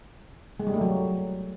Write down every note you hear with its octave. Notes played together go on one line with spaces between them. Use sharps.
G#3
G3
A3
F#3